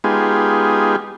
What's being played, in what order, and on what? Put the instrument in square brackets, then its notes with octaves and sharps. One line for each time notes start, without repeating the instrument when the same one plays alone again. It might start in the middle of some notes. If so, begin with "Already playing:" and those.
[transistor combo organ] G#3 B3 D#4 F4 G4 G#4